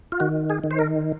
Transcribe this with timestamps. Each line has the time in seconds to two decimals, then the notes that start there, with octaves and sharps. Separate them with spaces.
0.12 F4
0.20 D#3 F#4
0.50 G#4
0.64 D#3
0.71 C5
0.79 A#4